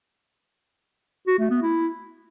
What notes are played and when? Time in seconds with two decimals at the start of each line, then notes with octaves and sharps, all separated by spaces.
1.27 F#4
1.39 A3
1.50 B3
1.62 E4